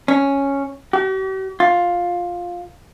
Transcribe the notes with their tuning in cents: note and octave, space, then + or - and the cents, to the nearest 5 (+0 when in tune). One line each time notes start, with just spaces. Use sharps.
C#4 +0
G4 -45
F4 +10